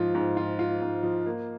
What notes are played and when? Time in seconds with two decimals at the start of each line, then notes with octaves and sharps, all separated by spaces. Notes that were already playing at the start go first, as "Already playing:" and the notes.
Already playing: G#2 F3 F4
0.15 G#2
0.37 F4
0.59 F4
0.82 G#2
1.03 F3
1.26 A#3